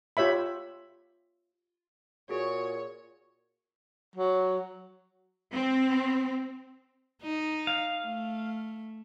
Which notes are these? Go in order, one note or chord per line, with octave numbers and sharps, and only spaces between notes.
F4 G4 C#5 E5 B5
A#2 F#4 G#4 C#5
F#3
C4
D#4
F5
A3